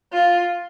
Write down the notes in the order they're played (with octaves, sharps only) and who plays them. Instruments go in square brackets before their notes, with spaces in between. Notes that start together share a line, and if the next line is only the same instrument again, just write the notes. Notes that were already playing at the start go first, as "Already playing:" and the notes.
[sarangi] F4